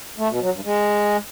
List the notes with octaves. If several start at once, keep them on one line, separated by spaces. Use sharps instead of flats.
A3
B2
F#3
G2
G#3